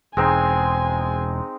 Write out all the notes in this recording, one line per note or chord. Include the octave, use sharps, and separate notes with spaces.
E1 G#3 C4 D#4 G#5